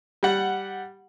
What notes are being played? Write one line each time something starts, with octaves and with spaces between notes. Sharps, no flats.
G3 F#5